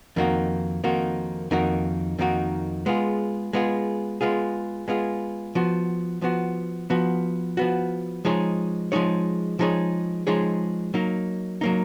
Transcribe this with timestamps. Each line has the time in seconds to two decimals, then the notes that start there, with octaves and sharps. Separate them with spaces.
0.16 F2 D#3 A#3 D#4 F#4
0.84 F2 D#3 A#3 D#4 F#4
1.51 F2 D#3 A#3 D#4 F#4
2.19 F2 D#3 A#3 D#4 F#4
2.86 G#3 B3 F4 G#4
3.53 G#3 B3 F4 G#4
4.21 G#3 B3 F4 G#4
4.88 G#3 B3 F4 G#4
5.55 F3 B3 F#4
6.22 F3 B3 F#4
6.90 F3 B3 F#4
7.57 F3 B3 F#4
8.25 F3 G#3 D#4 G#4 C#5
8.92 F3 G#3 D#4 G#4 C#5
9.59 F3 G#3 D#4 G#4 C#5
10.27 F3 G#3 D#4 G#4 C#5
10.94 F#3 A#3 D#4
11.61 F#3 A#3 D#4